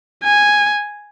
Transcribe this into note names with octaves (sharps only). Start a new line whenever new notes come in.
G#5